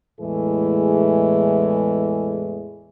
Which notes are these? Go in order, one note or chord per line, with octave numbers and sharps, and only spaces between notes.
E2 A2 E3 G#3 A3 G#4